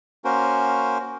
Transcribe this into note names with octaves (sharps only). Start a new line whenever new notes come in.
A#3 C#4 F#4 A#4 C5